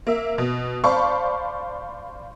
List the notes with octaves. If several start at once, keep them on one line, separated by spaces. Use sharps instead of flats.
A#3 E5
B2
C5 D5 F5 A5 B5 C#6